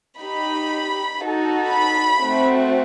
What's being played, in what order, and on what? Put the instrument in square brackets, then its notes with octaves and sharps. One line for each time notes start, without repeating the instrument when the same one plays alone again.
[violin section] D#4 G4 B5
D#4 F#4 A4
B5
A3 C4 F#4